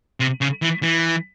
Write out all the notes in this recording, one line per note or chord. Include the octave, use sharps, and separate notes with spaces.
C3
C#3
E3
E3